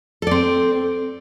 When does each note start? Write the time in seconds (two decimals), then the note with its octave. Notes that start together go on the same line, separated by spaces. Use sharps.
0.22 A4
0.27 D5
0.31 C4